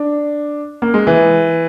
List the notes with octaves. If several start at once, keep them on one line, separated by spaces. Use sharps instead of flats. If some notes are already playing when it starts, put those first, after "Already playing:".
Already playing: D4
A#3
G#3
E3